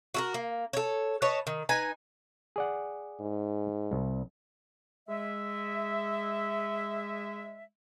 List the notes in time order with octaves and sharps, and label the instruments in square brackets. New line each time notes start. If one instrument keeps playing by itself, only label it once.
[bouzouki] F#4 A4 A#4
A#3
A4 C#5
B4 C#5 D#5 A5
D#3
D#4 B4 G#5
[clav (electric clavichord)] G#4 D5 F#5
[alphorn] G#2
[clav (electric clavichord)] C2
[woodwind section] G#3 E5